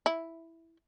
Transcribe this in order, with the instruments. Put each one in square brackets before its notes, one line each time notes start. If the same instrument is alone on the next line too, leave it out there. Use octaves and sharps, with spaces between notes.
[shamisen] E4